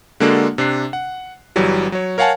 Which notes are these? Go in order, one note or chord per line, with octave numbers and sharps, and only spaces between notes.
D3 G#3 A#3 D4 F#4 A4
C3 D4 F#6 C7
F#5
G1 E3 F#3 G3
F#3 C#5
A#4 C#5 F5 F#5 G#5 A5